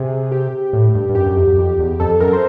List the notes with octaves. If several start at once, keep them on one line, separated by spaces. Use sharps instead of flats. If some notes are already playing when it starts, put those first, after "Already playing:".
Already playing: C3 G#4
G4
A2
G2
G2
F#2 G4
F#2
F2
F#2
F2
E2
F2 A4
F#2 A#4
C5